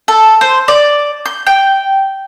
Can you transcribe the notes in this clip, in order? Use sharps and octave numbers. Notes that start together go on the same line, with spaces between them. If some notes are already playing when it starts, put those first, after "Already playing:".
A4
C5
D5
G6
G5